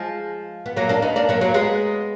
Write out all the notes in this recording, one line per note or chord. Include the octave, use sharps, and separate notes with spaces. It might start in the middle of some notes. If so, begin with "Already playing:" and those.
Already playing: F3 G#3
B3
F#3 A#3
A#3 D4
B3 D#4
A#3 D4
F#3 A#3
F#3 A#3
G#3 B3